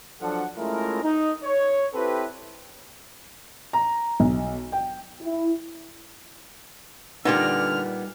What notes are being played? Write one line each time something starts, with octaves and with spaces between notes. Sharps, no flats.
F3 F#3 D4 A4 F#5
G#3 A3 C#4 E4 F4 A#4
D#4
C#5
C4 E4 G4 A4 B4
A#5
B1
G5
E4
A#2 D3 G3 B3 D#4 F6